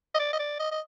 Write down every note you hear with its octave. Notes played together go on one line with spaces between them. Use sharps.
D#5
D5
D#5
D5
D#5
D#5